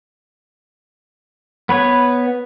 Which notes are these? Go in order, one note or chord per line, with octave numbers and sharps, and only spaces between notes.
B3 B4 C#5